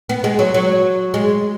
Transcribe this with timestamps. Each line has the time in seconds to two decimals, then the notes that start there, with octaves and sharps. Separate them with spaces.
0.09 B3
0.24 G#3
0.39 F#3
0.54 F#3
1.14 G#3